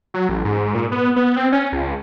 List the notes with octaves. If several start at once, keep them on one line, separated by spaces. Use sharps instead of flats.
F#3
A1
G#2
A#2
B3
B3
C4
C#4
C#2